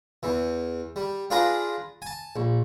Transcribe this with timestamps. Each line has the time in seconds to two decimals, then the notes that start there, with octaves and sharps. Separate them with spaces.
0.23 E2 E3
0.96 G3
1.30 D4 F4 G#4 B4 A#5
2.02 G#5 A5
2.36 A#1